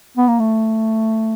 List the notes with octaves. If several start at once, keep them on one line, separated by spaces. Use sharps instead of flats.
B3
A#3
A3